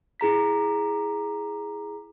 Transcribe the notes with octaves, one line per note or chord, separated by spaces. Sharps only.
E4 G#4 A#5 B6